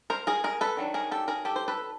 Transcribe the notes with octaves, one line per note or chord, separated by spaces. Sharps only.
A#4 C5
G#4 A#4
G#4 A#4
A4 B4
D#3 F#3 D4
G#4 A#4
G4 A4
G#4 A#4
G4 A4
C5
A4 B4